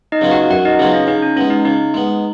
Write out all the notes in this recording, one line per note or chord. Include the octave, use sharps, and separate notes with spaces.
D#4 D#5
C#3 F#3 B3 F4
F#4 F#5
F#2 F#4 F#5
D#4 D#5
C#3 F#3 B3 F4 G#4
C#4
C#3 D#4
C#4
G#3 B3 C#4
D#4
C#3 D#4
G#3 B3